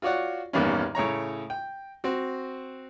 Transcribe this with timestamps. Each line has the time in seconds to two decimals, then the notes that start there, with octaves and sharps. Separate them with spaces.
0.02 F4 F#4 C#5 D5 F#5
0.53 A1 E2 G2 D#3 A#3 C#4
0.95 A2 C#3 C#5 A#5
1.50 G5
2.04 C4 F#4